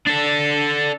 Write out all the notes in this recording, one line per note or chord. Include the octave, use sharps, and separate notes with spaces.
D4 A4